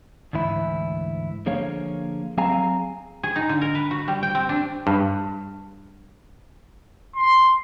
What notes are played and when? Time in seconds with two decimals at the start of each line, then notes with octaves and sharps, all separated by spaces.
0.33 D2 G#2 E3 E4
1.46 D3 F3 A#3 G#4 C#5 F5
2.38 F#3 C4 G#4 F5 G#5 A#5
3.23 G#4
3.36 D#4
3.49 D3
3.61 A#4
3.75 B4
3.91 F#4
4.08 G3
4.23 G5
4.35 C4
4.49 D4
4.87 G2
7.16 C6